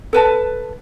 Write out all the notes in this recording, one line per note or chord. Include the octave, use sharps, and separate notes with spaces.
A4 B4 A5